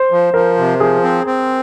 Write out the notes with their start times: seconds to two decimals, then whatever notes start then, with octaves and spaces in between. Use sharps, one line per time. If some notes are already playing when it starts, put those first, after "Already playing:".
Already playing: C5
0.11 F3
0.34 F3 A#4
0.57 C3
0.80 F3 G#4
1.03 C4
1.27 C4